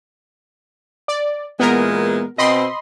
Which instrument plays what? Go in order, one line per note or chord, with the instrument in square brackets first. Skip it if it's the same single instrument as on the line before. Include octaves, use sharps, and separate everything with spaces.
[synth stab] D5
[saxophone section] A#2 E3 G#3 [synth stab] B3 A#4
[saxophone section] B2 C4 [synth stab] D#5 B5 C6